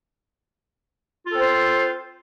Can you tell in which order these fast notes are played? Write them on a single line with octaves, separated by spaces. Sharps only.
F4 A4 C4 C5